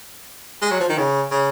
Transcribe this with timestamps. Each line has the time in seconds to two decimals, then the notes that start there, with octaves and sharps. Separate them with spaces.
0.61 G#3
0.71 F#3
0.80 F3
0.89 D#3
0.98 C#3
1.31 C#3